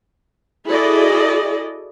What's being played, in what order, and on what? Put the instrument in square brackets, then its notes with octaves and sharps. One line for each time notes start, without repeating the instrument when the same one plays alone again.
[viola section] E4 F#4 G#4 A4 D5 D#5